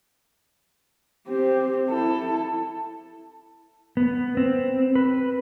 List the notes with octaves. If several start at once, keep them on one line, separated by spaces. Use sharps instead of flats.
C4 G4
E4 A4
B3
C4
B4